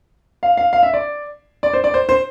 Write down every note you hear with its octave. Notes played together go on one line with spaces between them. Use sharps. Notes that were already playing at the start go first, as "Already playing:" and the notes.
F5
F5
F5
E5
D5
D5
C5
D5
C5
C5